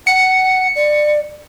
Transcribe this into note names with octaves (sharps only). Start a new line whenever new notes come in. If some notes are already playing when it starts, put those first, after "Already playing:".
F#5 C#7
D5